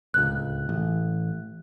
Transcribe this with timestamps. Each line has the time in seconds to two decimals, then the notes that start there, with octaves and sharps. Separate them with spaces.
0.14 D1 C#2 F#6
0.69 A1